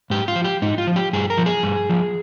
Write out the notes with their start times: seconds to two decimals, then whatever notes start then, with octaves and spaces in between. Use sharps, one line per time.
0.10 G#2 G4
0.28 F4
0.36 F3
0.44 G4
0.62 G#2 D#4
0.78 F4
0.87 F3
0.96 G4
1.13 G2 G#4
1.30 A#4
1.38 F3
1.46 G#4
1.63 G2
1.89 F3